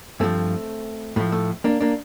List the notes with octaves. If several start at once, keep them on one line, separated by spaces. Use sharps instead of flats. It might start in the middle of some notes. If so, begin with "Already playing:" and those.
G2 F3 A3 C4
A2 F3 A3
A3
A#3 D4
A#3 D4